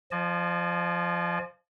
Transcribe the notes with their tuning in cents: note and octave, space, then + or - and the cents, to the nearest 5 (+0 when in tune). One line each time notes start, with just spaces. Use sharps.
F3 +0 D#5 -45 G#5 +45